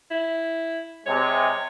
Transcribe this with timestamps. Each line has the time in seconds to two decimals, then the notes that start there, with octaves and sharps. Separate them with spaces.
0.11 E4
1.06 C3 G#3 C#5